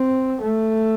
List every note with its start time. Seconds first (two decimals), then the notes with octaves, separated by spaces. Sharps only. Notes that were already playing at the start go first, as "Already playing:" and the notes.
Already playing: C4
0.41 A3